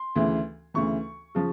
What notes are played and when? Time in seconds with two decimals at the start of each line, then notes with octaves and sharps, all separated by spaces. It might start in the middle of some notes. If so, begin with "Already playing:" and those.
Already playing: C6
0.16 D2 C#3 E3
0.74 D2 C#3 E3 C#6
1.35 C#3 F3